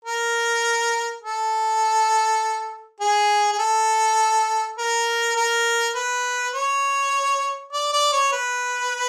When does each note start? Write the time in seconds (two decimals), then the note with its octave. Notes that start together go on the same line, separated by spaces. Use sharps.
0.05 A#4
1.23 A4
3.00 G#4
3.52 G#4
3.59 A4
4.78 A#4
5.36 A#4
5.95 B4
6.55 C#5
7.73 D5
7.93 D5
8.13 C#5
8.33 B4